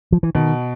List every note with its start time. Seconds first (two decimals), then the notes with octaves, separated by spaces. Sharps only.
0.12 F3
0.23 E3
0.35 B2 D#3